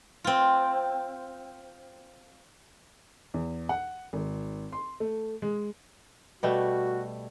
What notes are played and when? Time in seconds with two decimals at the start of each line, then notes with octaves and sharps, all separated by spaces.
0.24 C4 F4
3.34 E2
3.69 F#5
4.13 G#1
4.73 C6
5.00 A3
5.42 G#3
6.43 B2 G3 A3 F#4